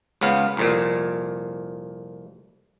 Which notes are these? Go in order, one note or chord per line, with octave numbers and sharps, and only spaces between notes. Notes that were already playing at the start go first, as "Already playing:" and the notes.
C#2 C#3 B3 F5
C2 F2 A#2